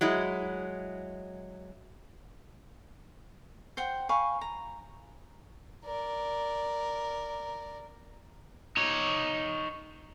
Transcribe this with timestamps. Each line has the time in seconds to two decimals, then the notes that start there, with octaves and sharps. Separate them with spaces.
0.01 F#3 G#3 E4
3.77 C5 F#5 G5
4.09 F5 G#5 B5 C#6
4.41 A#5
5.84 A#4 D5
8.77 D#4 C#5